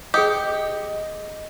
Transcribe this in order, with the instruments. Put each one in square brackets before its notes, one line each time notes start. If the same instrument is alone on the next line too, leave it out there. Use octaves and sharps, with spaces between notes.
[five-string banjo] G4 [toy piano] G#4 G5 D#6 [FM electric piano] D#5